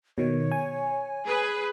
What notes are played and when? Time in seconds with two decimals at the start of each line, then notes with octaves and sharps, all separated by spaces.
0.18 B2 D#3 C#5
0.52 G#5
1.25 G#4 B4